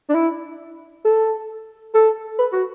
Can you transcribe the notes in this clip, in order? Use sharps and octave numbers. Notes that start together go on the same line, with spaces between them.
D4
E4
A4
A4
B4
F#4